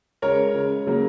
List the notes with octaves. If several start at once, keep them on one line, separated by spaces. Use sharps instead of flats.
C#3 G#3 A#4 C#5
C#3 G#3
C#3 F#3 A#3